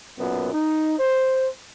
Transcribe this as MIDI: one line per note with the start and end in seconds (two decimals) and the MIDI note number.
0.19 0.51 35
0.19 0.51 42
0.19 0.51 46
0.19 0.51 59
0.53 0.95 63
0.99 1.48 72